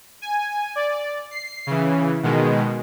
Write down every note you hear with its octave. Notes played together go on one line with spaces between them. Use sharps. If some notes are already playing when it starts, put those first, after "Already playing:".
G#5
D5
C7
C#3 E3
B2 D#3 G#3